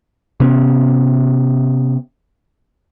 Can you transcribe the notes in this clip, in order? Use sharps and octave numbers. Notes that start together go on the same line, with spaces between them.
C3 B3 C#4